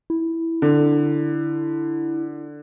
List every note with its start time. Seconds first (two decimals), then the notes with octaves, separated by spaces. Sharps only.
0.10 E4
0.62 D3